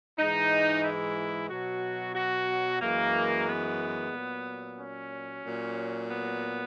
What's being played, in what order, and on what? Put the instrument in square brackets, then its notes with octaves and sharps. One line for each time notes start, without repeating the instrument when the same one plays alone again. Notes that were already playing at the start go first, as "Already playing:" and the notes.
[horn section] G#2 E3 G#3 D#4
E4
B2 F#3 F#4
F#4
F#2 E3 G#3 A#3
B3
A#2 F#3
C#4
A#2 F#3
B3